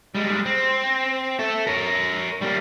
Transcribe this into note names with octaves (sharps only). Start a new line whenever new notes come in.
G3 G#3
C4
A4 E5
A#4 C#5
G3 A#3